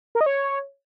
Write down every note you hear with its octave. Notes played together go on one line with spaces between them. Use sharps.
A#4
D#5
C#5